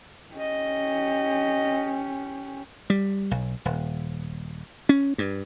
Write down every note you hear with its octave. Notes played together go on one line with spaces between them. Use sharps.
C#4 G4 D#5
G3
B1
D#1
C#4
G2